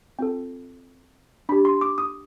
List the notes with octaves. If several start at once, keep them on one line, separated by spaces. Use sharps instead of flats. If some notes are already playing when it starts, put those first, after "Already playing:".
C4 F4 A4 G5
D4 G4 B5
C6
D6
D#6